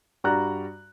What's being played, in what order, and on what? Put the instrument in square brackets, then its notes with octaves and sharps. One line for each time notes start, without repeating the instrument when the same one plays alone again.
[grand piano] G2 G3 F#4 D5 A#5 F#6